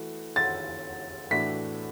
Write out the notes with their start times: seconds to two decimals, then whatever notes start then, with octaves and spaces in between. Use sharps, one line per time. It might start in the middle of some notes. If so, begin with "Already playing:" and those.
Already playing: E3 A3 F#4
0.36 A6
1.31 A2 E3 A3 D4 F#4 B6